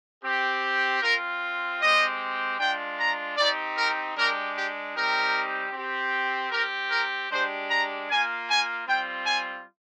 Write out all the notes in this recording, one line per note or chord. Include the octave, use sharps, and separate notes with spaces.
C4 G4
C4 F4 A#4
G#3 C4 G4 D#5
G#3 D4 F4 G5
A#5
C4 D#4 G4 D5
A#4
G#3 D4 G4 A#4
G4
G3 C4 D#4 G4 A#4
C4 G4
C4 G4 A#4
A#4
G#3 D4 G4 C5
A#5
A#3 F4 G#5
G#5
G3 C4 F4 G5
G#5